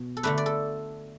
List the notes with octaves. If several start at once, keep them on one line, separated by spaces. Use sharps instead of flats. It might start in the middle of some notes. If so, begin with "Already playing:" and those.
Already playing: B2
A4
D3 A3 D4 B4
D5
A4